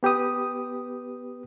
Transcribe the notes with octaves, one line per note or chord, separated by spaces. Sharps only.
B3 G4 B4 D#6